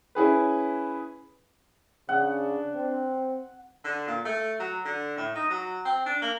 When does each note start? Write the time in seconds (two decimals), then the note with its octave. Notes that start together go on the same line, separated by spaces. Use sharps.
0.15 C#4 E4 G#4 B4
2.09 C#3 D4 F#5
2.75 C4
3.84 D3
4.07 A#2
4.25 A3
4.60 F#3
4.85 D3
5.17 A2
5.35 D#4
5.50 F#3
5.85 C4
6.06 D4
6.22 A#3